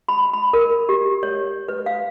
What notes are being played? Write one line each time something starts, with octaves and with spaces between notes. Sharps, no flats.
B5
B5
A#4
G4
C#5
B4
F5